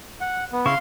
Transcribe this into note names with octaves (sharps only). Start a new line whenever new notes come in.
F#5
B3
C#3 E4 F5 C6 C#6